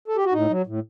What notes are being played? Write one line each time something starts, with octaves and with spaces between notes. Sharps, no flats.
A4
G4
F#4
A2 D#4
F#3
A2